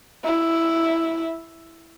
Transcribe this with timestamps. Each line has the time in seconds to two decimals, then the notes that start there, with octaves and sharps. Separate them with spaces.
0.25 E4